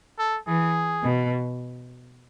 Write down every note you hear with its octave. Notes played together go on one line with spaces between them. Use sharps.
A4
E3 G#4
B2